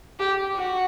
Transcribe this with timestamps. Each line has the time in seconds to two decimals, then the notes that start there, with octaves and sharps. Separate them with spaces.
0.19 G4
0.55 F#4